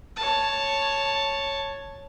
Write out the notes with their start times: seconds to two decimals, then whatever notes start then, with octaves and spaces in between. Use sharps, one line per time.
0.16 C#5 A5